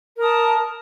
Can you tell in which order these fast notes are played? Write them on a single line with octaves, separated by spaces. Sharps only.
A#4 D#6 A5